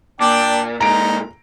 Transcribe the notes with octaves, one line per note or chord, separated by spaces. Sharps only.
A#2 D4 D5 G5
A#2 G#3 D#4 A#5 D7